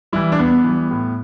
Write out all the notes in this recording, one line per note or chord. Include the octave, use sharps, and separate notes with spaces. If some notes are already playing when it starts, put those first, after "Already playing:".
E3 G3 E4
D4
E2 B3
E3 G3
A2